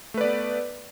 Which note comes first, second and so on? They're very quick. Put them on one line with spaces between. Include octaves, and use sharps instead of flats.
A3 B4 D5 B3